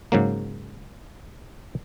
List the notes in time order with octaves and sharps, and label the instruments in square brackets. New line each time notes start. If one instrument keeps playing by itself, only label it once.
[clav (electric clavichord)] G#2 C#3 F#3 A#3